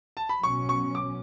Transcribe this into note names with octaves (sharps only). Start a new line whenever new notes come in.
A5
B5
B2 F#3 C#4 C#6
C#6
D6